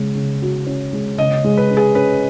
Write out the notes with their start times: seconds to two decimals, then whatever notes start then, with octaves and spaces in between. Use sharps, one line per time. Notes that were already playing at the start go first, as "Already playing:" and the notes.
Already playing: C#3 G#3
0.15 C#3
0.42 F#4
0.67 C#4
0.93 G#3
1.18 C#3 D#5
1.44 G#3
1.57 B4
1.70 C#4
1.77 G#4
1.95 C#4 B4